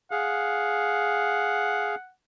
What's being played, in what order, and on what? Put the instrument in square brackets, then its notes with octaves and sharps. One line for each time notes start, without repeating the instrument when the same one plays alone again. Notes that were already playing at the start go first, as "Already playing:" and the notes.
[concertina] G#4 F5 [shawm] F#5